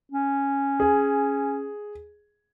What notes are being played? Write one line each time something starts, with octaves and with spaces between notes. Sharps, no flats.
C#4
G#4